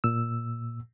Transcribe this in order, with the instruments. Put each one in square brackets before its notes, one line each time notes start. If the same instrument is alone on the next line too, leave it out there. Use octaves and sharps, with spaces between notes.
[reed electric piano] A#2 E6